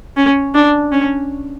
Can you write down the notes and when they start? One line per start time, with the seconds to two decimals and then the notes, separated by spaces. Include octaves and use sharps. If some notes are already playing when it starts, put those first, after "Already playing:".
0.16 C#4
0.54 D4
0.92 C#4